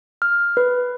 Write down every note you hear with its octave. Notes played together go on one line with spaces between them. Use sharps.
F6
B4